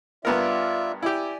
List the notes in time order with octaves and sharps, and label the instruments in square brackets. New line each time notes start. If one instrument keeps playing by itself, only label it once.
[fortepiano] G2 B3 A#4 [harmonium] F4 D5 E5
[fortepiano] E4 G4 [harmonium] D5 G#5